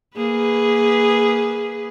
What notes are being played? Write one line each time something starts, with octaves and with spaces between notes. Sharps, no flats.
A#3 G#4 B4